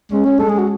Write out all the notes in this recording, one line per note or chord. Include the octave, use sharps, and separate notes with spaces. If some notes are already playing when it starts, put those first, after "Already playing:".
G#3 C#4
C#4
G#3 A4
G#4
F#4